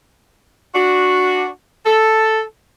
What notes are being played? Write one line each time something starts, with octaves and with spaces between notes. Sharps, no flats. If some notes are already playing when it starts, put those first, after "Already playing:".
D4 F#4
A4